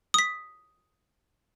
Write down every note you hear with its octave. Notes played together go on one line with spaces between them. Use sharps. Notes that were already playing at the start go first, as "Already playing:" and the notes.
D#6 B6